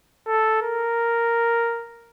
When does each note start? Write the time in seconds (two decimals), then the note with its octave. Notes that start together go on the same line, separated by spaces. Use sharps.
0.27 A4
0.62 A#4